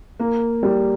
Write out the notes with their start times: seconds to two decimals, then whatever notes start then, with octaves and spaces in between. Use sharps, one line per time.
0.20 A#3
0.63 G3